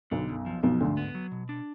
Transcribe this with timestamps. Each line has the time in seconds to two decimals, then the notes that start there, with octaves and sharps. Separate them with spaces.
0.11 B1 B2 D3
0.28 F#2
0.46 F3
0.63 B1 B2 F3
0.80 D2 G#2 D3
0.97 B3
1.15 F#3
1.32 B2
1.49 D4